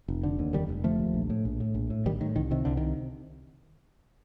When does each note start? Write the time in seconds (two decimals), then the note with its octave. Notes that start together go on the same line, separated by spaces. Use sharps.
0.08 F1
0.23 D3
0.39 D#2
0.53 F1 D#3 G3
0.69 F1
0.84 D3 F3 A3
0.99 D#2
1.14 A#1
1.30 A2
1.45 A#1
1.60 A2
1.75 A#1
1.90 A2
2.05 A#1 D#3 G3
2.21 A2 D#3
2.36 C2 D#3
2.51 C3 D#3
2.65 C2 D3
2.77 C3 D#3